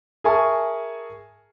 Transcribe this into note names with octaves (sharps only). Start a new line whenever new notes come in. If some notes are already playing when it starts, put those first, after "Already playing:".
G#4 A#4 E5 G#5 A5 C#6